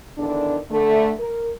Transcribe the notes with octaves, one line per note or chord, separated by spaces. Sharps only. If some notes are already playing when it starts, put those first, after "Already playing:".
E2 D3 D#3 D4
D3 A3
A#4